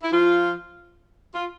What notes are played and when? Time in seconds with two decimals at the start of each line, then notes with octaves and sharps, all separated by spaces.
0.03 E4
0.12 F3 F4
1.35 F4